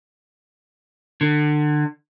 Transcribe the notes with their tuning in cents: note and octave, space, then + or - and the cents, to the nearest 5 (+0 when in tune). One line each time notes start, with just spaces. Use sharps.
D3 +30